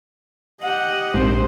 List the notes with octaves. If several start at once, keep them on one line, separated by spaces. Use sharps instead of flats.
G4 D#5 F#5
A#1 G#2 C4 C5